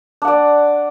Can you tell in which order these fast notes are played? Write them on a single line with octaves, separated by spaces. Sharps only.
D4 F#5 D5